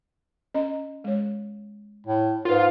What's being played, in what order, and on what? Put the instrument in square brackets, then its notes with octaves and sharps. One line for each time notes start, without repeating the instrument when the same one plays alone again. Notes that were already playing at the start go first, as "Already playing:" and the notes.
[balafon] C#4 D#5 A#5
G#3 C#5
[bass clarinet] A2
[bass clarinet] G#2 [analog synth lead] F4 [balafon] A#4 B4